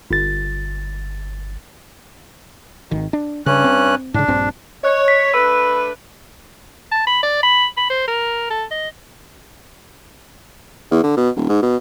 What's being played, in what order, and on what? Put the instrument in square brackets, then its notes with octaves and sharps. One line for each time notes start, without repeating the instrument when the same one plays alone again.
[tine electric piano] G1 A6
[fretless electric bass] G#1 D#3
D4
[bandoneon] G2 C#4 F#6 [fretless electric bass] C#3
[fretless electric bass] C4
[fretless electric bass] G#2 C#3 [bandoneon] D4
[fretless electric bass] A#1 G2 C4
[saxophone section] C#5 [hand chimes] D#5 F#6
[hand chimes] B6
[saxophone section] A3 D4 B4 [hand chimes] B5 E6
[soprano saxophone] A5
B5
D5
B5
B5
C5
A#4
A4
D#5
[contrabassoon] E2
D3
B2
D#1
G#2
B2